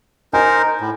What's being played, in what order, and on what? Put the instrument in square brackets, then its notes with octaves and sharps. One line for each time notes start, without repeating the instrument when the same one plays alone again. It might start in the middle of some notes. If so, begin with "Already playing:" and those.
[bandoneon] D#4 A#4 C5 [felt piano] G#5
[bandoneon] A2